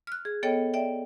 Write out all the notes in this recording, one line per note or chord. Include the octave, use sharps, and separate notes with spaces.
F6 F#6
G#4
B3 A4 C#5 D#5 G5
D5 E5 G5